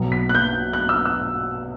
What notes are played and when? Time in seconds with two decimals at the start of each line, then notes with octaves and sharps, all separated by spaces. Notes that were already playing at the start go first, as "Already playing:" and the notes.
Already playing: B1 B2 F#3
0.12 B6
0.29 F#6
0.35 G6
0.73 F#6
0.89 E6
1.05 E6